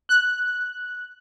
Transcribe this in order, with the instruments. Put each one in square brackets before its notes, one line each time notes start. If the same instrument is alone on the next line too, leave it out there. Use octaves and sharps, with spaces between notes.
[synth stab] F#6